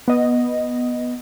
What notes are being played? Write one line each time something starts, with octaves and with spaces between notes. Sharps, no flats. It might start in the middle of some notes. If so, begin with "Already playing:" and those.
B3 D#5